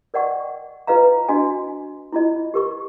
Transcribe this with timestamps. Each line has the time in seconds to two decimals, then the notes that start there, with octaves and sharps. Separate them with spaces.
0.14 A#4 D5 D#5 F#5 G5 C#6
0.87 F4 B4 D#5 F5 A#5
1.29 D4 F#4 D#5 G#5
2.12 E4 F4 D#5
2.54 G4 A#4 C#6